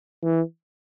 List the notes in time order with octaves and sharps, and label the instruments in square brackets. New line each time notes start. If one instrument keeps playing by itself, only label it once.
[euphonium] E3